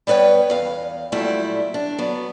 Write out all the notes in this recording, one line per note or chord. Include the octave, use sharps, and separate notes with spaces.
G3 B3 B4 C#5 G5
E2 F5
A#2 F#3 G3 A3 E4 G4
D4
F#3 B3